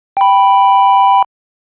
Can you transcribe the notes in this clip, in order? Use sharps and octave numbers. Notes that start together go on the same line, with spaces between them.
G5 B5